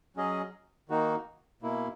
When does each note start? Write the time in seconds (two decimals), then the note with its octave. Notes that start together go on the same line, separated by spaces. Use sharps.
0.16 F#3 C#4 G#4 D#5
0.89 D#3 A#3 D#4 F#4
1.62 B2 A#3 E4